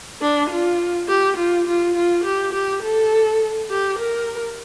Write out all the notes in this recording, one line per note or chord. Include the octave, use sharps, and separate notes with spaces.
D4
F4
G4
F4
F4
F4
G4
G4
A4
G4
A#4